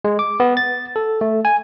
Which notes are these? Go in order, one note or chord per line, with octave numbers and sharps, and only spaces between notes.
G#3
D6
B3
A6
A4
A3
G#5